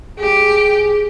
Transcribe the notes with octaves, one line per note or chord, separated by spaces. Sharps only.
G4 G#4